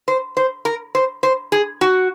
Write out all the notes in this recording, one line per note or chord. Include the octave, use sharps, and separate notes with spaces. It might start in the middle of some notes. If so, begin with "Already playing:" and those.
C5
C5
A#4
C5
C5
G#4
F#4